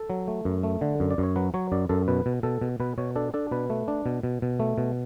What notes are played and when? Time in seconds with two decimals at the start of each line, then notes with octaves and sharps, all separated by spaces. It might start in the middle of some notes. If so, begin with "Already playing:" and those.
Already playing: A4
0.10 F#3
0.28 A3
0.45 F#2
0.63 A3
0.81 D3
1.00 F#2
1.11 D5
1.18 F#2
1.23 C#5
1.36 F#3 B4
1.54 F#3 C#5
1.72 F#2 D5
1.89 F#2 A4
2.08 B2 B4
2.26 B2
2.43 B2 A4
2.61 B2
2.80 B2 B4
2.98 B2 C#5
3.16 D4 A4
3.34 D4 A4
3.51 B2 B4
3.70 A3
3.88 D4
4.06 B2
4.23 B2
4.42 B2
4.60 A3
4.78 B2